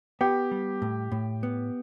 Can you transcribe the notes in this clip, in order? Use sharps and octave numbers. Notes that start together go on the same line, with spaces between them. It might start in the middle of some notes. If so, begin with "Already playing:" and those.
B3 G4
G3
A2
A2
B3